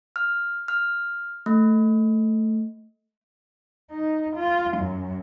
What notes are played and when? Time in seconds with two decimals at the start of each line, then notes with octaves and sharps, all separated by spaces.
0.16 F6
0.68 F6
1.46 A3
3.91 D#4
4.36 F4
4.78 F#2